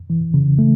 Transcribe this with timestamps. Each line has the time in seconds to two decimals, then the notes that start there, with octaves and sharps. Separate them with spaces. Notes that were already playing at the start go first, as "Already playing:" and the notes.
0.10 E3
0.34 C#3
0.59 A3